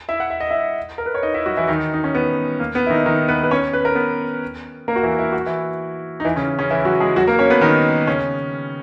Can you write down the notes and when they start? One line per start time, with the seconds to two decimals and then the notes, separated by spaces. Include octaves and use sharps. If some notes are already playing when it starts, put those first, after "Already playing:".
0.09 E4 E5
0.20 F#5
0.30 E5
0.40 D#5
0.50 E4 E5
0.98 A#4
1.06 B4
1.15 C#5
1.23 D#4 D#5
1.34 E4 E5
1.46 F#3 F#4
1.57 E3 E4
1.68 D#3 D#4
1.94 D#4
2.04 C#4
2.15 B3
2.59 A#3
2.75 B3
2.86 E4
2.90 D#3 D#4
3.06 D#3 D#4
3.28 B3 B4
3.43 B4
3.51 C#4 C#5
3.73 B4
3.85 A#4
3.95 B3 B4
4.88 A#3 A#4
4.96 F#4
5.03 E3 E4
5.19 E4
5.32 F#4
5.46 E3 E4
6.20 D#4
6.25 E3 E4
6.36 C#3 C#4
6.59 C#3 C#4
6.70 E3 E4
6.85 F#3 F#4
7.00 G#3 G#4
7.16 F#3 F#4
7.27 A#3 A#4
7.39 C#4 C#5
7.50 B3 B4
7.61 D#3 D#4
8.07 C#3 C#4